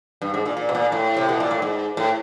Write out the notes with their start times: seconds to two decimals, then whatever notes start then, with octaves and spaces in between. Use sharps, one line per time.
0.22 G2
0.34 G#2
0.46 A#2
0.57 A#2
0.69 B2
0.75 A#2
0.92 A2
1.17 C3
1.29 B2
1.40 A#2
1.51 A2
1.62 G#2
1.97 A2